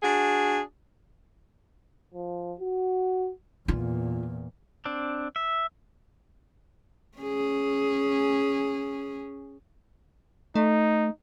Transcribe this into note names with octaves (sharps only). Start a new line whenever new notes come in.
D4 F#4 G#4
F3
F#4
E2 A#2 F4
C4 D4
E5
C#4 G#4
A3 D#4